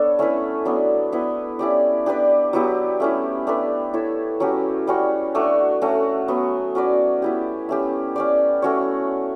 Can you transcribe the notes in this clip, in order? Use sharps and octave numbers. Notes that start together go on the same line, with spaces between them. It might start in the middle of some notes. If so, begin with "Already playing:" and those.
Already playing: B3 D4 A4 C#5
A3 C#4 E4 B4
F#3 B3 D4
B3 E4 B4
C#4 E4 G4 D5
D4 G4 B4 D5
F#3 B3 E4 G4
A3 C#4 E4
A3 D4 G4 B4
E4 A4 C#5 E5
F#3 C#4 G4
G3 C#4 F#4 C#5
A3 D4 F#4
A3 C#4 F#4
F#3 B3 F#4
C#4 F#4 B4 D5
B3 E4 G4
A3 C#4 G4
C#4 G4 D5
A3 C#4 F#4 C#5